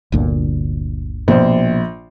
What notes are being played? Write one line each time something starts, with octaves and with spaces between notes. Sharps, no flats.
G1 D2 A#2
A#1 B2 C5